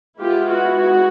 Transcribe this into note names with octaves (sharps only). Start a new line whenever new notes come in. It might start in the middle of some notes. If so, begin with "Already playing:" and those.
G#3 B3 E4 F4 G4
F#4
F#4